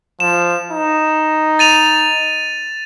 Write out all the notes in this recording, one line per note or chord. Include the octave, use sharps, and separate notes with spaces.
F3 E7
D#4
A6 D#7 F7